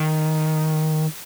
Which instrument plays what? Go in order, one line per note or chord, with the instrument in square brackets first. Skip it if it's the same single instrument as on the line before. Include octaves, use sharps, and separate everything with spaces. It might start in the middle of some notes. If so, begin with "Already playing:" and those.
Already playing: [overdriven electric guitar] D#3